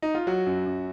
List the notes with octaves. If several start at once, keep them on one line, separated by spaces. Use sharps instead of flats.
D#4
F4
F#3 F#4
F#2
F#2